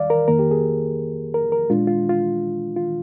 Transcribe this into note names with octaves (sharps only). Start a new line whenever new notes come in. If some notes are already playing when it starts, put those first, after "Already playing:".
Already playing: D#2 D#3 G3 D5 F5
A#4
F2 D#3 A#3 A#4
G4
G#4
A#4
A#4
A#2 G#3 D4 F4
F4
F4
F4